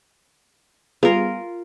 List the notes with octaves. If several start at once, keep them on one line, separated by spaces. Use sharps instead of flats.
G3 B3 F4 G#4 A#4